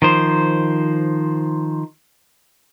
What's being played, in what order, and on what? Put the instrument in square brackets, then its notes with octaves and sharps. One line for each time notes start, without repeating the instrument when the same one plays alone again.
[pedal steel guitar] D#3 F3 C5